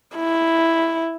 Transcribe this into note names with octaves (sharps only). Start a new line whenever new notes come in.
E4